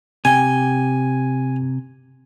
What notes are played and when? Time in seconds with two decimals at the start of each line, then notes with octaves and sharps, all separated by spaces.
0.25 C3 G5 G#5